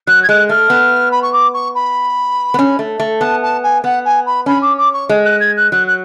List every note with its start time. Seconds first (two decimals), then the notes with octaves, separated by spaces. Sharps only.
0.07 F#3 F#6
0.23 G#6
0.29 G#3 F#6
0.49 A3 F6
0.70 B3
1.11 B5
1.22 C#6
1.32 D6
1.53 C#6
1.75 B5
2.54 B3
2.59 C#4
2.79 A3
3.00 A3
3.21 B3 A5
3.42 A5
3.63 G#5
3.84 B3 F#5
4.04 G#5
4.26 B5
4.46 C#4 B5
4.61 D6
4.77 D6
4.93 C#6
5.09 G#3
5.24 F#6
5.40 G#6
5.57 F#6
5.71 F#3 F#6
5.87 F#6